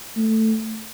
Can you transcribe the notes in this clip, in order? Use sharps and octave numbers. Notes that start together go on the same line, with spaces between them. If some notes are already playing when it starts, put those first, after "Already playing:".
A3